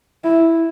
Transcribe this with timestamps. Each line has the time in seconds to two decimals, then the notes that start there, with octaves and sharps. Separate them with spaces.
0.24 E4